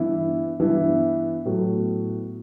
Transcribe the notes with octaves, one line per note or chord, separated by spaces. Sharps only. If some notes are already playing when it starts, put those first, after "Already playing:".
Already playing: G2 E3 B3 E4
G2 E3 B3 E4
A2 F#3 B3